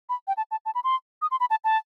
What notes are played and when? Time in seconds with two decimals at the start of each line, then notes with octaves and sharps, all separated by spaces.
0.09 B5
0.28 G5
0.37 A5
0.51 A5
0.66 A5
0.75 B5
0.84 C6
1.22 D#6
1.31 C6
1.40 B5
1.50 A5
1.64 A5